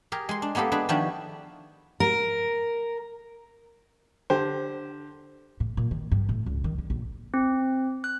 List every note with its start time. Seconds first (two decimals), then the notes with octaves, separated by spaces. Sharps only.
0.12 G4 G#4 A#4
0.29 G#3 C6
0.42 D4
0.55 G#3 A#3 B3 G4 A4
0.72 D4 G#4 B4
0.89 D#3 F3 D4 E4 F#4 G4
2.00 A#4
4.30 D3 G4 C5
5.60 A2
5.77 A#2
5.91 D#3
6.11 G2
6.29 A2
6.46 C#2
6.64 D#3
6.78 D3
6.90 A#1
7.34 C4
8.04 F#6